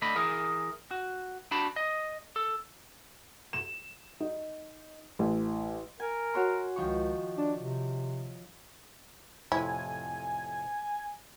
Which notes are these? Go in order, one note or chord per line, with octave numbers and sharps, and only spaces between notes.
D3 A3 D#5 B5
E3 G#4 A#4
F#4
D4 F#4 A5 B5
D#5
A4
E7
D#4
A1
A#4 G#5
F#4 C#5 C6
C#2 D#3 F3 C#6
D4
C3
F2 A2 C3 E4 G#5